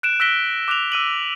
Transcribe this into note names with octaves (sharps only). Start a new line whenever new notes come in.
F#6 D7 E7
E6 F#6 A#6 B6 D7 G7
D6 F#6 E7 F7
E6 D#7 F#7